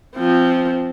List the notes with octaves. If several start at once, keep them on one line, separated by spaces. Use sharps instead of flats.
F3 C4